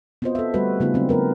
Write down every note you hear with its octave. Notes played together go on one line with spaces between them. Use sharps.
B3 C4 F4 F#4 C5 D#5
A4 E5
D3 G3 A3 F#4 B4
C#3 A3 B3 D#4 F4 G#4
F#3 C4 D4
F3 A3 B3 A#4 B4